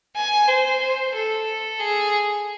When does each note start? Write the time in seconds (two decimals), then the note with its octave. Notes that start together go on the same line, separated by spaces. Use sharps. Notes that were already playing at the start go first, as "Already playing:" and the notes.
0.16 G#5
0.48 C5
0.82 C5
1.15 A4
1.80 G#4